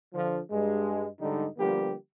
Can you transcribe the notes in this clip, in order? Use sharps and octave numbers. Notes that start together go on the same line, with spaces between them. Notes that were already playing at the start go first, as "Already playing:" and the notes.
D3 F3
G2 G#3
G#2 D3 G3 G#3 D#4
D3 F3 G3 A#3 B3 G4